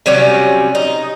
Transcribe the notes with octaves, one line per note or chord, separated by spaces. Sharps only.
C3 F#3 G3 C#4
D#4